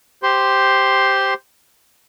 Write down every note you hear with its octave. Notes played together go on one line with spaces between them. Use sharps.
G4 C5 C6